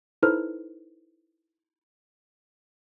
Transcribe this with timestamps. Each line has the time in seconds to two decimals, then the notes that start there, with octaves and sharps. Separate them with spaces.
0.23 D#4 E4 A4 B4 C5 F6